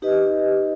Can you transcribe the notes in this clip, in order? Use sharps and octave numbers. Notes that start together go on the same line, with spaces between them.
D#4 G4 B4 D#5